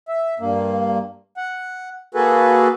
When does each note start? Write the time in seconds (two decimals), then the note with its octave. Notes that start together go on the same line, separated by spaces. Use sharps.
0.08 E5
0.40 G2 A#3
1.37 F#5
2.15 A#3 F#4 G#4 A4 B4